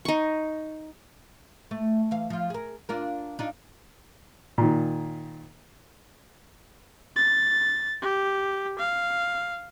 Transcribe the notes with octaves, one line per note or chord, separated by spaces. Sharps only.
D#4 C#6
A3
E3 F5
F3 F4
G#4 A#4
D4 F4 A#4
D4 D#4 F4
A#2 D#3
A6
G4
F5